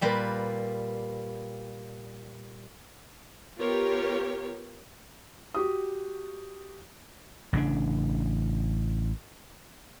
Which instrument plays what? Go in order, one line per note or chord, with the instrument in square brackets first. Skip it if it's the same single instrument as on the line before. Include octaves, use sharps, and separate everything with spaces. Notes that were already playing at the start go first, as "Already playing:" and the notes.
[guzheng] A#2 G3 A#3 B4
[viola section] B3 F4 G4 A#4 C#5
[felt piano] F#4 G4 D#6
[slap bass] A1 C#3 C#4 D4